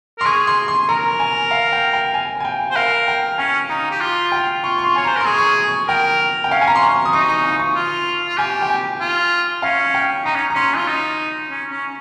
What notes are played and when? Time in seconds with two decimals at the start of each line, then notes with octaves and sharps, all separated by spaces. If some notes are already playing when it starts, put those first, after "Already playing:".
0.19 A#4 C6
0.26 G#4 C#6
0.47 C6
0.68 C6
0.89 A#4 A#5
1.20 G#5
1.51 F5
1.73 G5
1.93 G5
2.14 G#5
2.40 G#5
2.45 G5
2.71 C5
2.76 A#4 F5
3.08 G5
3.38 C#4 G#5
3.70 D#4 A#5
3.91 G4
4.01 F4
4.32 G5
4.64 F4 C#6
4.78 C#6
4.84 C6
4.96 C#5 G#5
5.05 C5 A#5
5.17 A#4 C6
5.26 G#4 C#6
5.38 C#6
5.47 D#6
5.68 C#6
5.88 A#4 G5
6.44 G5
6.50 C#4 F5
6.61 G#5
6.68 A#5
6.76 C6
6.82 C#6
7.05 D#6
7.13 D#4 C#6
7.29 C#6
7.59 C#6
7.75 F4
8.28 F4
8.38 G4 G#5
8.62 G5
8.70 G#5
9.01 F4
9.62 C#4 F5
9.94 G5
10.25 D#4 A#5
10.35 C#4
10.50 A#5
10.55 C#4 C6
10.77 F4
10.87 D#4
11.51 C#4
11.71 C#4